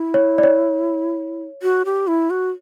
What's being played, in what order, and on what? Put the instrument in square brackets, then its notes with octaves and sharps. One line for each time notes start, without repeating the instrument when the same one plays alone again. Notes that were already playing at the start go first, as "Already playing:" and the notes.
Already playing: [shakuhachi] E4
[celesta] C#5
D5
C#5
[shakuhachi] F#4
G4
E4
F#4